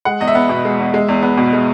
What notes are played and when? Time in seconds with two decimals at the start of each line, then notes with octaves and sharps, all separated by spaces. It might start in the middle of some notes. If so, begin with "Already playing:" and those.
0.05 G#3 F#5
0.21 E2 D#5
0.27 E5
0.35 B3
0.49 B2
0.65 G#3
0.79 E2
0.94 G#3
1.09 E2
1.22 B3
1.37 B2
1.53 G#3